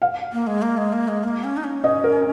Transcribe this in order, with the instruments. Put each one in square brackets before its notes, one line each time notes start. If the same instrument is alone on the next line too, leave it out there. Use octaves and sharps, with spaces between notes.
[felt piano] F5
[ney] A#3
G#3
A#3
G#3
A#3
G#3
A#3
C#4
D#4
C#4
[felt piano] D#5
A#4